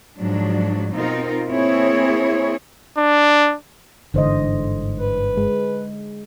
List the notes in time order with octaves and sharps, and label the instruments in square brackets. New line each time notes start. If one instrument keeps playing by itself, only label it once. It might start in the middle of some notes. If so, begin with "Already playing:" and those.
[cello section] G#2 F3 F#3 D4
B2 C4 D#4 F4 A#4
A#3 C4 E4 G#4 C#5
[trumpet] D4
[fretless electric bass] G1 G#2 E3 [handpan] D3 C5 D#5
[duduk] B4
[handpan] G#3